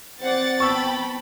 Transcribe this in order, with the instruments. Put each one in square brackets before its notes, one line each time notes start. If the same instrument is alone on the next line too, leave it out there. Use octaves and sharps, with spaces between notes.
[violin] C4 A6 [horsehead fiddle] C5 D5 [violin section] F#5
[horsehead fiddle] B3 A5 [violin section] G5 B5 [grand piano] C#6 E6